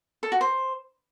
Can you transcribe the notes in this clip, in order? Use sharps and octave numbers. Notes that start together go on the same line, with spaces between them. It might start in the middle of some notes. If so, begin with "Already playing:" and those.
A4
F#4
C5